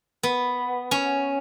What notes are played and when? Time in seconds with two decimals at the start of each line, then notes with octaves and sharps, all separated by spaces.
0.23 B3
0.91 C#4